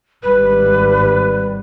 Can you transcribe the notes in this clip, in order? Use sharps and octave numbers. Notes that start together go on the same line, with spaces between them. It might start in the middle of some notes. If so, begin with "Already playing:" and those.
G#1 G3 B4